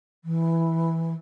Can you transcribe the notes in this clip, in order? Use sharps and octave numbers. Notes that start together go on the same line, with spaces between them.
E3